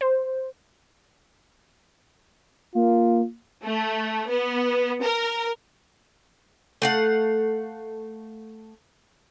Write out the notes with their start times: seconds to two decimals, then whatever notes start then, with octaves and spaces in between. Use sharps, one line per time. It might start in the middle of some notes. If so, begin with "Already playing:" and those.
0.01 C5
2.75 A#3 F4
3.64 A3
4.29 B3
5.02 A#4
6.82 A3 F5 F#5